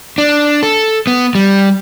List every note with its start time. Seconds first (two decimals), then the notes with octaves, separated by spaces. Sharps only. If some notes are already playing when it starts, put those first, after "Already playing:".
0.18 D4
0.63 A4
1.07 B3
1.35 G3